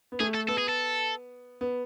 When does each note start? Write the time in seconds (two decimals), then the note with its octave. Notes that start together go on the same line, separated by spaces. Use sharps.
0.12 B3
0.20 A3 G#4
0.35 A4
0.48 B3 A4
0.58 G#4
0.69 A4
1.61 B3